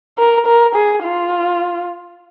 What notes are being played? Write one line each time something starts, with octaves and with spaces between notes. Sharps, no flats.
A#4
A#4
G#4
F4